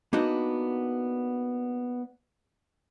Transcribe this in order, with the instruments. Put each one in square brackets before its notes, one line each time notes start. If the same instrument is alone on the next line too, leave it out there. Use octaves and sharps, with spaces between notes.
[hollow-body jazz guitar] A#3 B3 D4 D#4 F#4